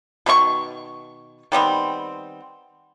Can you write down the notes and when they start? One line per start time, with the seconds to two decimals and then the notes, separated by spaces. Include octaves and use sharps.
0.26 B2 D#3 D#4 C#6
1.52 D#3 G3 B3 C4